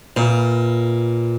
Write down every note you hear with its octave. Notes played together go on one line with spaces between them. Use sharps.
A#2 A#3 F4 B4